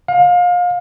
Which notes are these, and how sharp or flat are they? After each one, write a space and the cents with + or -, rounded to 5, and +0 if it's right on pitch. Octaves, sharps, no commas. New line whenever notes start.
F5 +30